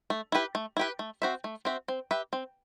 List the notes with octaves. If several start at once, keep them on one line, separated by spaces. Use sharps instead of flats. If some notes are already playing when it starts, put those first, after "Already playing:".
A3
E4 G4 B4
A3
E4 G4 B4
A3
C4 F#4 C5 E5
A3
C4 F#4 C5 E5
C4
G4 B4 E5
C4